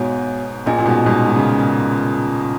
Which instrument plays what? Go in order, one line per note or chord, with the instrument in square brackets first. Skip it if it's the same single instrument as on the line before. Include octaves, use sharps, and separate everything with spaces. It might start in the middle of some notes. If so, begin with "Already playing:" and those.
Already playing: [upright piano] G#2 B2 [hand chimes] B3 F#4 C#5 G#5
[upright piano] A#2 [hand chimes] C#4 G#4 D#5 G#5
[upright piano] A#2
G#2 B2
G#2 B2
G#2
C#3